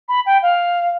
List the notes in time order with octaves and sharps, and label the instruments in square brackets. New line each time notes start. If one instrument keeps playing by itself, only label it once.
[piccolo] B5
G5
F5